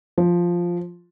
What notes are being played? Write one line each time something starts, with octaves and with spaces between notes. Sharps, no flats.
F3